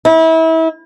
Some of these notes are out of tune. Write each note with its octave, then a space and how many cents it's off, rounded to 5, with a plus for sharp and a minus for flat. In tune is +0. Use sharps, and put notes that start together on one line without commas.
E4 -30